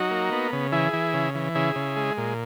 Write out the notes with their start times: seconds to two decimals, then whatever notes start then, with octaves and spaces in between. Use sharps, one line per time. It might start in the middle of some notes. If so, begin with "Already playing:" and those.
Already playing: F#3 D#4 F#4
0.11 A#3
0.32 B3
0.53 C#3
0.72 E3 E4 G#4
0.93 E3
1.13 C#3
1.35 E3
1.55 C#3 E4 G#4
1.76 C#3
1.96 G#3
2.17 A#2